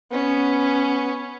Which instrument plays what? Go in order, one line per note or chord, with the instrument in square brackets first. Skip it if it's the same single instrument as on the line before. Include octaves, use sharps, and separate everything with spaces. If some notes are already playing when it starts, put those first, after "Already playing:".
[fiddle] B3 C#4